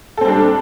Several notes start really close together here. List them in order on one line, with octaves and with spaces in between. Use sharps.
A4 C4 G3 D4